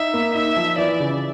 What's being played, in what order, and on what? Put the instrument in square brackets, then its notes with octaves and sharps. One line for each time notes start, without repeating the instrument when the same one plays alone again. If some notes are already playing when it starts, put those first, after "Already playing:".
Already playing: [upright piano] D#4 [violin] E5
[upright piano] A#3
[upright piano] D#4 [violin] E5
[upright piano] F3
[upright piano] E3 [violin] D5
[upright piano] C#3